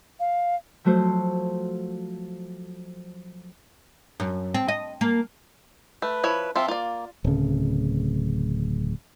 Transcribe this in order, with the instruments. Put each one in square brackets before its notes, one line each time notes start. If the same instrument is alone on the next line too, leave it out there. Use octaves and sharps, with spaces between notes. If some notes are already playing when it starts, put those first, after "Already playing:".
[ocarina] F5
[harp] F3 F#3 A3 F#4 C5
[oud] F#2
C4
D#5
A#3
[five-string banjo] A3 [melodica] B4
[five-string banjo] F3 E4 C#5
[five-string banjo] F3 F4 [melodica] C4 E5 C6
[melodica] A#3 [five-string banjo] F4 D5
[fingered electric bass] D1 C#3